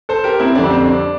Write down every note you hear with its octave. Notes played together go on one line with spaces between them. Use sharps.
A4 C5
G4 A#4
C4 E4
F2 D3 G3 D4
C4
D4